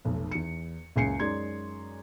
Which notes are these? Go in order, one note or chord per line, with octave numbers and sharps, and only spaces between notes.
F1 B1
E2 C#7
F#1 C#2 G#5 C7 C#7
F#2 G#3 D#4 D5 C6 G#6